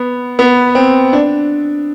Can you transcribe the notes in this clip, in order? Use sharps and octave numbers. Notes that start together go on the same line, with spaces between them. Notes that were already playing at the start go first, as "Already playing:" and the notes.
Already playing: B3
B3
C4
D4